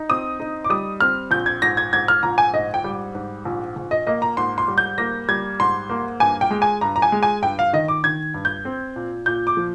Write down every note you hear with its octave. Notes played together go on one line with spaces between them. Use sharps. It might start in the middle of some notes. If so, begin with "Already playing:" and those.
Already playing: D#4
C4 D#6
D#4
D6
G3 D#6
C4 F6
A#1 G6
G#6
G#2 A#6
G#6
G#2 G#6
F6
A#1 A#5
G#5
G#2 D#5
G5
G3
G#2
A#1
A#1
D#5
A#3 D#5
A#5
G#2 C6
C6
G3
G6
A#3 A#6
G3 G#6
G#2 C6
A#3
G2 G#5
G5
G#3
G#5
G2 A#5
A#5
G#5
G#3
G#5
G2 G5
F5
D#3 D#5
D6
D#3 G#6
G2
G6
C4
A#2
A#2 G6
D6
F3